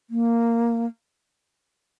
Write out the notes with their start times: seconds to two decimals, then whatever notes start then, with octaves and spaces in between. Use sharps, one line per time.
0.10 A#3